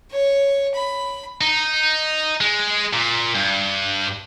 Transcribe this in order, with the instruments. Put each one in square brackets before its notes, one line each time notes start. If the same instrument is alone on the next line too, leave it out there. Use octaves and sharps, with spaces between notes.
[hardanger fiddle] C#5
B5
[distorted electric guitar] D#4
G#3
A#2
G2